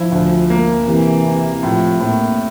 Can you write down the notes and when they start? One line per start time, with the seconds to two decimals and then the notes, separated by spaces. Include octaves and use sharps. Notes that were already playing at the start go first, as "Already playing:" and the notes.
Already playing: F3 E4
0.12 D2
0.50 A#3
0.87 C3 E3
1.26 C3
1.63 A2 F3
2.01 A2 A#3